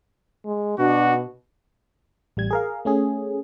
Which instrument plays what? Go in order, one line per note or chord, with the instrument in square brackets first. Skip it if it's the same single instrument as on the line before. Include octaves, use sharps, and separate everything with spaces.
[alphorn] G#3
[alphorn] B2 [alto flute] D4 [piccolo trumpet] F#4
[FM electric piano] A1 G3 G#6
G#4 A#4 F5
A3 C#4 G#4